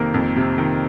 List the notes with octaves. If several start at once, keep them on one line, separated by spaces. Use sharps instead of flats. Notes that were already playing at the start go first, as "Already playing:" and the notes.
Already playing: F2 C3 D#3 A#3
F2
C3
D#3